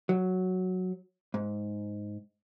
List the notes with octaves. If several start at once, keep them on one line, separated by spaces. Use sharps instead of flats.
F#3
G#2